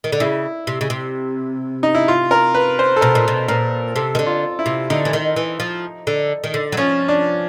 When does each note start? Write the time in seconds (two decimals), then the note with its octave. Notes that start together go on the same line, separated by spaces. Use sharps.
0.04 D#3
0.12 D3
0.20 C#3 E4
0.67 C3
0.81 C#3
0.90 C3
1.83 D#4
1.95 E4
2.08 F4
2.31 A#4
2.54 B4
2.79 C5
2.96 A4
3.01 B2 A#4
3.15 A#2
3.28 B2
3.48 A#2 A#4
3.96 C3 A4
4.15 D#3
4.19 D3
4.26 F4
4.59 E4
4.66 C3
4.90 D3 D#4
5.05 E3
5.13 D#3
5.36 E3
5.60 F3
6.07 D3
6.44 D#3
6.54 D3
6.72 F#3
6.77 F3 C#4
7.08 D4